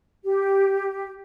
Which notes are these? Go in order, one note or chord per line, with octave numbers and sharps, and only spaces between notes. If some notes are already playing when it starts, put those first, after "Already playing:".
G4